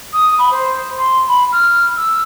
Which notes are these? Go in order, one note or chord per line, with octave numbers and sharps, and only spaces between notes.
D#6
B5
C5
C6
B5
F6
E6